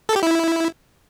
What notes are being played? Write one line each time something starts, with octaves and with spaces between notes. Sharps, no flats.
A4
G4
E4